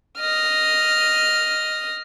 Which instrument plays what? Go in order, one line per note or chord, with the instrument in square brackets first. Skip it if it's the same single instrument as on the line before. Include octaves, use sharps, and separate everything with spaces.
[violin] D#5 F6